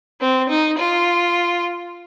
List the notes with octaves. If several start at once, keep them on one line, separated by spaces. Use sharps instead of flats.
C4
D#4
F4